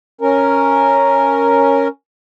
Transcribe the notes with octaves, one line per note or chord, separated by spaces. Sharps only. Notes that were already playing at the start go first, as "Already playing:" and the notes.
C#4 A#4